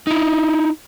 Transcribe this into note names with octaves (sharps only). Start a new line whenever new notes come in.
D#4 E4